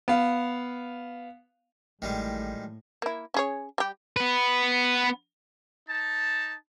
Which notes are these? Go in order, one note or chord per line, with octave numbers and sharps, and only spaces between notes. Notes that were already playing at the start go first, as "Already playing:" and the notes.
B3 F5
A1 A2 D#3 G3 G#3
A#3 E4
C#4 G#4 C#5
G3 G4
B3 B4
D#4 A5